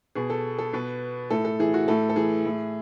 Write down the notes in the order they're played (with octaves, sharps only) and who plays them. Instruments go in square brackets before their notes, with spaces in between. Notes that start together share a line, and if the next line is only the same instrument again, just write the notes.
[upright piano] B2 G#4
A4
A4
B2 B4
A2 A4
A4
E3 G#4
F#4
A2 A4
A4
E3 G#4
A2